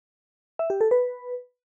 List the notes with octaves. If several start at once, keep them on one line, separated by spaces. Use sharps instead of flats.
E5
G4
A4
B4